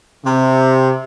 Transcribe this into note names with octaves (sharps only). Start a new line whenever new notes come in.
C3